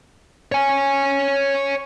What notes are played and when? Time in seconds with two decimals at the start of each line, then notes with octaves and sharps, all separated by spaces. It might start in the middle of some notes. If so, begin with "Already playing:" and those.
0.52 C#5 G#5